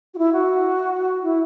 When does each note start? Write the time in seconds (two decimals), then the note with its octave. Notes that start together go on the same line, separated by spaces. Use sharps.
0.14 F#4
0.18 E4
0.33 F#4
1.23 E4